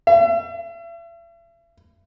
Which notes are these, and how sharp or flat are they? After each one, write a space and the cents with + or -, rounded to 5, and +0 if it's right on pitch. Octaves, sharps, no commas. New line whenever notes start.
E5 +40